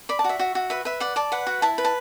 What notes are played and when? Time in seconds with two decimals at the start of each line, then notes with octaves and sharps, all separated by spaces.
0.09 D5 B5
0.19 A5
0.24 F#4 E5
0.39 F#4
0.55 F#4
0.70 B4 E5
0.85 B4 E5
1.00 D5 F#5
1.16 D5 A5
1.32 B4 F#5
1.47 F#4
1.62 E4 A5
1.78 B4
1.85 A5